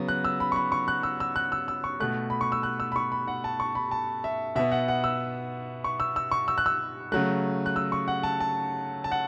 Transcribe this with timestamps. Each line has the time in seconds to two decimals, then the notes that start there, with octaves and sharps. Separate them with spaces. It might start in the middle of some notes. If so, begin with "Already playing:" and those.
Already playing: C#3 F#3 B3
0.08 F#6
0.24 E6
0.40 B5
0.52 C#6
0.56 B5
0.72 C#6
0.88 F#6
1.03 E6
1.20 E6
1.36 F#6
1.52 E6
1.68 E6
1.84 C#6
2.00 B2 A3 F#6
2.30 B5
2.41 C#6
2.52 E6
2.63 F#6
2.80 E6
2.92 B5
2.96 C#6
3.12 B5
3.28 F#5
3.44 A5
3.60 C#6
3.75 B5
3.91 A5
4.24 E5
4.55 B2 B3 E5
4.72 F#5
4.88 F#5
5.04 E6
5.84 C#6
6.00 E6
6.16 E6
6.31 C#6
6.48 E6
6.58 F#6
6.66 E6
7.12 C#3 F#3 A3 F#6
7.66 F#6
7.76 E6
7.92 C#6
8.08 F#5
8.23 A5
8.40 A5
9.04 A5
9.12 F#5